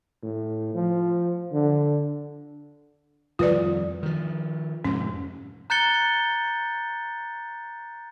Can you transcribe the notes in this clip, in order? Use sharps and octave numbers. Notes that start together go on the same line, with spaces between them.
A2
F3
D3
F2 D#3 G3 F4 B4 D5
D#3 F3
F2 G#2 C3 C#4
A#5 F#6 G6 A6 C#7 G7